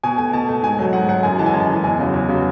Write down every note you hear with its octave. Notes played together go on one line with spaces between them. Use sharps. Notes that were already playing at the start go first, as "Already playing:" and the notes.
B2 G#5
A3 G#5
B2 A5
A3
G#2 G#5
F#3 A3
G#2 F#5
F#3 A3 F#5
F#2 G#5
E3 G#3 A5
G#5
F#2 A5
E3 G#3
E2 G#5
C#3 F#3
E2
C#3 F#3